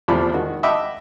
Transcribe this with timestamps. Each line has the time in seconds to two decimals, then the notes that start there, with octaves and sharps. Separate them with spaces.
0.08 E2 C3 F3 A3 D5 B5
0.34 D#3 F#4
0.63 D#5 E5 F#5 G5 B5 D6